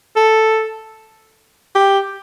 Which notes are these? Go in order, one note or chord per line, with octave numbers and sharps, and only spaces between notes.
A4
G4